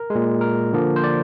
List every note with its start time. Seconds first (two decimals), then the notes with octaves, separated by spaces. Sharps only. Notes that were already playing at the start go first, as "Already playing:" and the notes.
Already playing: A#4
0.10 G#3
0.15 A#2
0.41 A#4
0.73 D3 F3 A#3
0.96 C5
1.04 D5